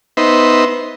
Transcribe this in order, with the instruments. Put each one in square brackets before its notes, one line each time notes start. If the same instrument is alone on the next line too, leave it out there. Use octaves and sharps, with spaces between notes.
[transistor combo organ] B3 D#4 C5 E5